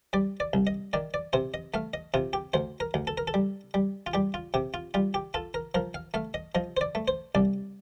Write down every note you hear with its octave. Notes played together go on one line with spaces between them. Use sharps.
G3 D5
D5
C2
D#5
D#3 D5
D5
C3 C5
D#5
A3 F5
D#5
C3 F4
G4
D2 C5
A#4
D2
A4
A#4
A4
G3
G3
F4
G3 G4
F4
C3 G4
F4
G3 F4
G4
F4 A4
A#4
F3 A#4
F5
A3 F5
D#5
F3 D#5
C5
D5
A3
C5
C2 D5